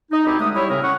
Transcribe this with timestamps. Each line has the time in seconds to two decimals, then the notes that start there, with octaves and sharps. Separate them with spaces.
0.11 D#4
0.25 D2 C4 D#4 G4 G#4 B5
0.39 D3 G#3 A3 D#6
0.55 G3 E4 C#5
0.69 A2 C#3 C4 G#4 A#4 C#5
0.82 C#4 F#5 C#6